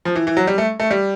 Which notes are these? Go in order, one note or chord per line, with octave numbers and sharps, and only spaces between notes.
F3
E3
E3
F#3
G3
A3
A3
G3